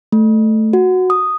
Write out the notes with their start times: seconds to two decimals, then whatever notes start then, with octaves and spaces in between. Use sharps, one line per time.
0.12 A3
0.73 F#4
1.10 D#6